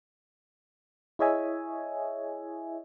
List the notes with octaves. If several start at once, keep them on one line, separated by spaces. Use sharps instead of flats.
E4 G#4 C#5 D#5 E5 G#5